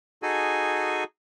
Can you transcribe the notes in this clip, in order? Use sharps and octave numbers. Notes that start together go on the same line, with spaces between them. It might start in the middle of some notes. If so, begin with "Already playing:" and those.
D#4 F#4 G#4 A4 G#5